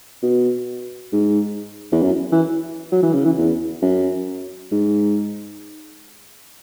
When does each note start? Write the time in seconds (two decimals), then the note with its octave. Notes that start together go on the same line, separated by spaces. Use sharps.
0.23 B2
1.12 G#2
1.92 E2
2.02 F#2
2.32 E3
2.92 F#3
3.02 E3
3.13 C#3
3.25 E3
3.38 E2
3.82 F#2
4.71 G#2